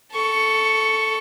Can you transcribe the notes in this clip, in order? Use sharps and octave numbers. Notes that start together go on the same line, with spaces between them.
A4 C#6